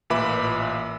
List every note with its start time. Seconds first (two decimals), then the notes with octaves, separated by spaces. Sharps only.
0.10 A1 A#2 B4 E5 B5 D6